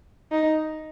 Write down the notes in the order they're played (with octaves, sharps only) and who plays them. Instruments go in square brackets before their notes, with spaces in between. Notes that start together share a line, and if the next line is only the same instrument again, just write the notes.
[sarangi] D#4